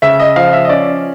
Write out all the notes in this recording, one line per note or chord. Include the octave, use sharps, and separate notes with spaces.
C#3 E5
D#5
F3 F5
E5
D#5
C#4 D5